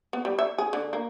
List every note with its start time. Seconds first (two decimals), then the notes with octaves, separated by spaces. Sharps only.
0.13 B3
0.25 G3
0.39 E5
0.58 G#4
0.73 D3
0.93 A#3